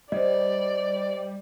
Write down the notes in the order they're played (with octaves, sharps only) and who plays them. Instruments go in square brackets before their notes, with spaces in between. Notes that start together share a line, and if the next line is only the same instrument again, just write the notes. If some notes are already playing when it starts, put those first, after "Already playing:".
[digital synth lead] G3 [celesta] C5 D#5 [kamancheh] D5